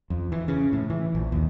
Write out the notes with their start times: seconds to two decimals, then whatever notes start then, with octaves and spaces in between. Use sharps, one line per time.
0.10 F2
0.32 E3
0.48 C#3
0.73 A2
0.90 E3
1.15 A#1
1.32 D#2